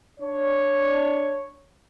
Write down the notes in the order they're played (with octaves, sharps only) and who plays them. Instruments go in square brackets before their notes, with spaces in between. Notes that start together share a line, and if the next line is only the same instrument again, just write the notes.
[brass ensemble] D4 C#5